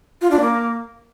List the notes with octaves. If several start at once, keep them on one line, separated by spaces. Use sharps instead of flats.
F4
D4
A#3